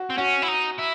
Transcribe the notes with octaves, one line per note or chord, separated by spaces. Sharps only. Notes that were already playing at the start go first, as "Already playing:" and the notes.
Already playing: F#4
C4
C#4 F#4
E4
D#4
E4